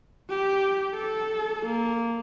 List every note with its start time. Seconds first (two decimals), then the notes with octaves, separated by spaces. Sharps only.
0.30 G4
0.95 A4
1.66 A#3